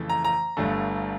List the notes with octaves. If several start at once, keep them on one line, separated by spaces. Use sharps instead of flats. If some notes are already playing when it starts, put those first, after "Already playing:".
Already playing: F2 C#3 E3 A3
A#5
A#5
G1 G2 D3 A3